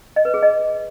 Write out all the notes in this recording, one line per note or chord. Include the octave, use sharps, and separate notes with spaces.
D#5
B4
G#4
D#5